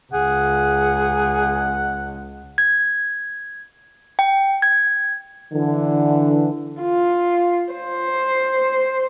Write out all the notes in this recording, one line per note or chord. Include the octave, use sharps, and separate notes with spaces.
C#2 G#4 F#5
G#6
G5
G#6
D3 E3
F4
C5